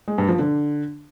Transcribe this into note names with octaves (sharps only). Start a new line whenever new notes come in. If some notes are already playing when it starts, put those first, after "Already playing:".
G#3
G2
F3
D3